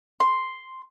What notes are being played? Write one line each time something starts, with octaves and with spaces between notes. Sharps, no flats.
C6